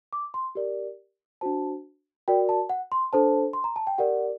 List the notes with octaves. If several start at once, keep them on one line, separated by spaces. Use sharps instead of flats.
D6
C6
G4 A#4 D5
D4 F#4 C5 A5
F#4 A#4 D5 G5
A5
F#5
C6
D4 A4 C5 A5
C6
A#5
A5
G5
G4 A#4 D5 F#5